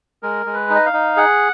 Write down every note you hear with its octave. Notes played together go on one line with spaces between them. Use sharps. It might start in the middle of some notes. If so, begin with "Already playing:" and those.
G#3 A#4
G#3
B4
D#4
D#5
F5
D#4
G#4 F#5